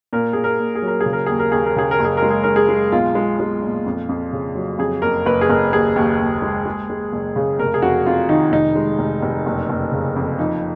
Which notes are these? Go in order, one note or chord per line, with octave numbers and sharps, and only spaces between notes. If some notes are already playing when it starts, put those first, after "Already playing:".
A#2 A#4
A#2 G#4
A#4
A#2
G#4
F#3
A#4
G#4
C#3
A#4
D#2 G#4
A#4
D#2 G#4
A#4
C#3 G#4
A#4
F#1 G#4
A#4
G#3
G#4
G#3 A#4
G#4
G#3
B1 F4
G#3
G#3
A#2
F2
F2
C#3
F#3
F2 G#4
F#1 A#4
F#1 B4
G#4
F#1 A#4
D#2 G#4
D#2
D#2
G#3
G#3
G#3
F#1
C#3
F1 A#4
G#4
F2 F#4
F2 F4
D#3 D#4
F1 D#4
G#3
F1
F1
F#1
F#1
C#3
F2
F3 D#4